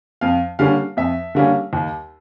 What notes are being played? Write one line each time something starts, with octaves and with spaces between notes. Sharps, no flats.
F2 F5
D3 G3 A#3 C#4 F5
F2 E5
D3 G3 A#3 C#4
D#2